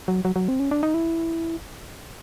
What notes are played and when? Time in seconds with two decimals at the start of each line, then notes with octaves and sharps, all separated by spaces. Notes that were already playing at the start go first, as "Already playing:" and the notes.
0.08 F#3
0.25 F#3
0.36 F#3
0.48 C4
0.60 C#4
0.71 D4
0.83 D#4
0.94 E4